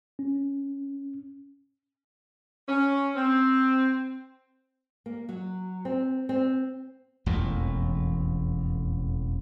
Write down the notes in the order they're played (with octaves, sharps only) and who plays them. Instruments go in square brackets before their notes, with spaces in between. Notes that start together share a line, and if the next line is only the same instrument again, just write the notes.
[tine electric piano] C#4
[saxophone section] C#4
C4
[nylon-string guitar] A#3
F#3
C4
C4
[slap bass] E1 A1 F2 A2